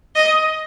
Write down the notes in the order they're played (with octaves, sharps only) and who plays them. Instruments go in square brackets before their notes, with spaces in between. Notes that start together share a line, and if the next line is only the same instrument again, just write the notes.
[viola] D#5